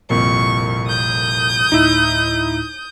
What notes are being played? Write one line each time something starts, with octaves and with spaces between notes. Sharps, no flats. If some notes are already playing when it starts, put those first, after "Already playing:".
G1 C2 F2 A#2 A#4 C#6
D#6 G6
D2 A2 D#4 E4 E6